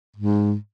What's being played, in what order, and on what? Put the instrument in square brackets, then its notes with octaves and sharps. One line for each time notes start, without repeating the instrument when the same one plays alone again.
[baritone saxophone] G#2